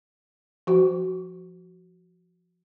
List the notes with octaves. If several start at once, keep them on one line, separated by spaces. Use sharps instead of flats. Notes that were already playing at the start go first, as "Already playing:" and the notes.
F3 F#4